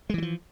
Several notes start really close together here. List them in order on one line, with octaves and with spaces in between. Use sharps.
G#3 E3 G3 F3